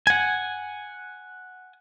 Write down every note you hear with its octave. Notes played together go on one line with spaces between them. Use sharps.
F#5 G#5